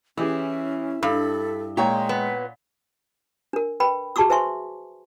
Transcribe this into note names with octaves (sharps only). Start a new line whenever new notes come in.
E3 C#4 E4 G4 G#4
G2 A4 B5
A#2 G#3 C#5 G5 A#5
B3
D4 A#4
B4 G5 B5
F#4 G#4 A5 C#6 D6 E6
B4 C5 E5 G#5 C6 C#6